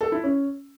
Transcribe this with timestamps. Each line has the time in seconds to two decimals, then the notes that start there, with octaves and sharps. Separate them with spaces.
0.01 A4
0.12 E4
0.24 C#4